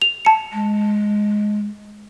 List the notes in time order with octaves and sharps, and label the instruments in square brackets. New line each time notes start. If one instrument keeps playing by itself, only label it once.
[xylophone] F7
A5 C#7
[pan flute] G#3